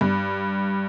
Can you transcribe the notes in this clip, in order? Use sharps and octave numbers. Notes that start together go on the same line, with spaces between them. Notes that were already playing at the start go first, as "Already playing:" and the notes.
G2